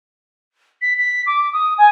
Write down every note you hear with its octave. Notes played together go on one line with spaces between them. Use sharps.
B6
B6
D6
D#6
G#5